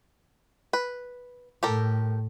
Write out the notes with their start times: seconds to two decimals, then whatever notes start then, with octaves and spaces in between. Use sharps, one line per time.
0.73 B4
1.63 A2 G4 A4 A#4